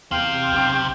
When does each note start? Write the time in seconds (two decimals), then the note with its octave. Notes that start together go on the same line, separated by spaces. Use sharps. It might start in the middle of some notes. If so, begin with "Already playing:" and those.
0.12 E2 C3 F5 G5
0.52 B1